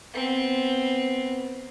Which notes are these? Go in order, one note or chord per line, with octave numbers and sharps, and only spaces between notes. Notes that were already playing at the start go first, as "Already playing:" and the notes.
B3 C4